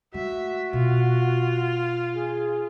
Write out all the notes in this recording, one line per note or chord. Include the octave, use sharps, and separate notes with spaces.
G#3 A3 F#4 E5
B2 F4
G#4